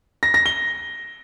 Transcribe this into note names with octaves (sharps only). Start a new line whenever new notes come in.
A#6
A#6
G7